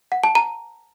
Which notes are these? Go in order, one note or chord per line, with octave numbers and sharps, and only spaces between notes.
F#5
A5
A#5